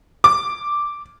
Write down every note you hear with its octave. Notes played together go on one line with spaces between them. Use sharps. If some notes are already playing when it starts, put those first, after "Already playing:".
D6